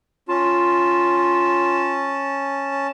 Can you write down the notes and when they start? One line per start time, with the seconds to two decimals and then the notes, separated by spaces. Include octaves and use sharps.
0.29 C#4 F4 A5